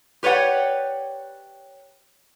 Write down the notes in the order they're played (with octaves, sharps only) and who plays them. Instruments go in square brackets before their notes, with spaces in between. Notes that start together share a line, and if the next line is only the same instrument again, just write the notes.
[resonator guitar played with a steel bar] G4 B4 C#5 D5 F#5 G5